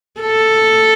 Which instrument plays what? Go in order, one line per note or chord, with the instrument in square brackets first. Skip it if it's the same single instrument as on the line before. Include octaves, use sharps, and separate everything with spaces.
[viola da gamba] A4